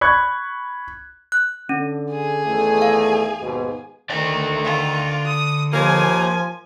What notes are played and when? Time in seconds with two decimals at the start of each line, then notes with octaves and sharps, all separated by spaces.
0.01 B5 C#6 F#6 G#6
1.32 F#6
1.69 D3 C#4
2.11 G#4
2.46 E2 D#3 A3
2.82 F5
3.41 D#2 G#2 B2
4.10 D3 D#3 D5 E5
4.64 F4
5.27 D#6
5.72 D#2 A#2 F3 A#3 G#5